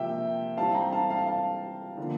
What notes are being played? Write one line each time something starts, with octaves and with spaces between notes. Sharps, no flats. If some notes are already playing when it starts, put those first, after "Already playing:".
Already playing: C3 F3 A#3 E5 G5
E3 G3 C4 F5 A5
G5 A#5
F5 A5
F5 A5
F5 A5
D3 F3 A#3